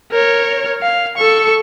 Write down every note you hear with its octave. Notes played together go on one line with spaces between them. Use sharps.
A#4 C#5
F5
A4 C#6